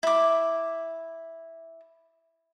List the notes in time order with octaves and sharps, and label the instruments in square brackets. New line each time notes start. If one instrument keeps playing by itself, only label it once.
[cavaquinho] E4 D6